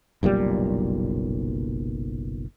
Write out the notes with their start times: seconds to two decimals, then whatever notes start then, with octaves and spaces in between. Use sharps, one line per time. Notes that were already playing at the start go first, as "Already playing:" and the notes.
0.23 F#1 B1 A#2 G3